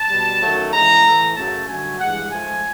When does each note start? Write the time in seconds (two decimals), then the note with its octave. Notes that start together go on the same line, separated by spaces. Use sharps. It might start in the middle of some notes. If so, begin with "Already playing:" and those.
Already playing: A5
0.10 B2 G3
0.42 F#2 D#3 F#3 A3
0.73 C#3 E3 G#3 A#5
1.05 A2 E3 A3
1.36 F#2 C#3 F#3 A3 A5
1.68 G2 D3 F#3 A3 G#5
2.00 G2 E3 G#3 F#5
2.31 G#2 F3 A3 G#5